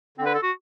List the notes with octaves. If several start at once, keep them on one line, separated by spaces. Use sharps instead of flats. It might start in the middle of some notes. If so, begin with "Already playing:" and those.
D3 C4
B4
A4
F#4